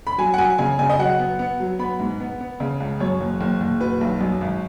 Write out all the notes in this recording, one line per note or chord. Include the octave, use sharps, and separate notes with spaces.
B5
F#3 G#5
F#5
F#3 G#5
C#3 G#5
C#3 G#5
D#5
F#3 F#5
B3
B3
F#3
B3 B5
G#2
B3
B3
C#3
C#2
F#2 C#5
F#1
F#1
F#1
B2 B4
B1
F#2
G#1